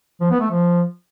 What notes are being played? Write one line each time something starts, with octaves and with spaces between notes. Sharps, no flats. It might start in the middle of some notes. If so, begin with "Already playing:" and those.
F3
B3
A3
F3